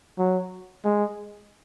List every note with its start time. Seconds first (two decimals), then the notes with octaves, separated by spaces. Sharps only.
0.18 F#3
0.85 G#3